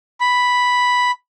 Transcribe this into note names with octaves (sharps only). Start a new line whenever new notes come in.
B5